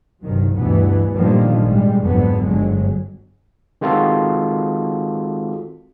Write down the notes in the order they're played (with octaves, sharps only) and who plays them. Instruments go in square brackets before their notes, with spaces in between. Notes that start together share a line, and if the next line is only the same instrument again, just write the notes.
[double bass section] G1 C2 D#3 F#3
D2 G2 B2 E3 B3
A#2 D3 D#3 F3 G3 A#3
G#1 G3 G#3
G#1 F2 G#2 D3 F#3 B3
G1 F#3 G#3
[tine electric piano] D#3 G#3 C4 F4 F#4 A4